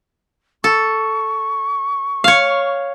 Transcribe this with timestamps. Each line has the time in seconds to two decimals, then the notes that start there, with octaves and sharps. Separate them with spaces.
0.64 A4 C#6
2.24 C#5 F5